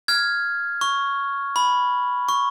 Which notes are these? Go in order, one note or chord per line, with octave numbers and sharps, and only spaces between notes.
F6 G#6
C#6
B5
C#6